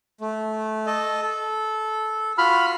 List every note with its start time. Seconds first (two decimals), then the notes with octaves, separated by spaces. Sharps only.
0.21 A3
0.87 A4 D#5 A5
1.22 A4
2.38 F4 F#4 B5 F6